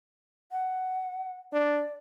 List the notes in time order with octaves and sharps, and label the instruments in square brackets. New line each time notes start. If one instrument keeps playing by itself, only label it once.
[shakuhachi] F#5
[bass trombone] D4 [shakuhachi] D5